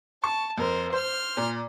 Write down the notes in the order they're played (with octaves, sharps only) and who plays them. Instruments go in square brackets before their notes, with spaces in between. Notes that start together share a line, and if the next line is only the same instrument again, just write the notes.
[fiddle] A5 [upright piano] C#6
[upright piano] F2 [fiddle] A#4 C5
[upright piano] C5 [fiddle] C6 F6
[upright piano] A#2